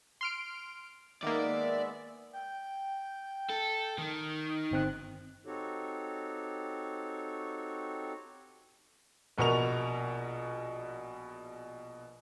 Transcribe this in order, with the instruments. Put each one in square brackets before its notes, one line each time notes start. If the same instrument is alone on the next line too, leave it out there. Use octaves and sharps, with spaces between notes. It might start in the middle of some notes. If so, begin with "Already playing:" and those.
[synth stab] C6 F6 D7
[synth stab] D#3 A#3 [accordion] G#3 B3 E5 [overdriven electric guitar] D5
[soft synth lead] G5
[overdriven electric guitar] A4
D#3
[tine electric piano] G1 C4 F#6
[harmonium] C4 D#4 F#4 G4 A4 C#5
[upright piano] A#1 B2 B3 A#4 C#6 F7